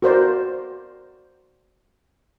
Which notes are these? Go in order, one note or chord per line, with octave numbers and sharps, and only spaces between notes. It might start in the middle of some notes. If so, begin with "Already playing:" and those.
F#4 A#4 C5 D5